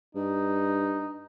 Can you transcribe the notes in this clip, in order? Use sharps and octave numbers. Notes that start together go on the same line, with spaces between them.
G2 D#4